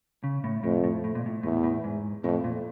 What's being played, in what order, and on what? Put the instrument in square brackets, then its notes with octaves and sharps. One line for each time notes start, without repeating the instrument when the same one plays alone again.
[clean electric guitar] C#3
A2
[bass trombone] F2 [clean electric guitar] A2
[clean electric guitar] A2
A2
A#2
A2
[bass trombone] E2 [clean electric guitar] A2
[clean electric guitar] A2
G#2
[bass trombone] F2 [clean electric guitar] A2
[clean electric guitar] A#2